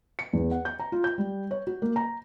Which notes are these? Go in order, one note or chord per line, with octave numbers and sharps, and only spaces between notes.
C#7
E2
F#5
G6
A#5
F4
G6
G3
C#5
F#4
A#3
A#5